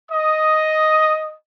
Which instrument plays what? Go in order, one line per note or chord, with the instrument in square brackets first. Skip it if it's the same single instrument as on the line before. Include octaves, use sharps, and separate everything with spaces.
[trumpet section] D#5 D#6